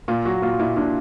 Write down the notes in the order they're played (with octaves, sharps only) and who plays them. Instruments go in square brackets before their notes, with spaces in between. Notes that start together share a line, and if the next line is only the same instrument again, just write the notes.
[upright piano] A#2 [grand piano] F4
[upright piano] F#3 [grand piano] F#4
[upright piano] A#2 [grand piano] F4
[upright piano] A#2 [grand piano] E4
[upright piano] A#2 [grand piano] D4